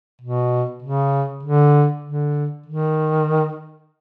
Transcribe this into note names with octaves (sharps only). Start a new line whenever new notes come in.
B2
C#3
D3
D3
D#3